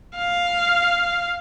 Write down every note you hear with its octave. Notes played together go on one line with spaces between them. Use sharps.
F5